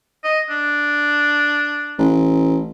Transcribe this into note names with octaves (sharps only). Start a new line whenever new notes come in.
D#5
D4
A1